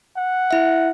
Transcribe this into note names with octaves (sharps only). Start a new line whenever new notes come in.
F#5
E4 E5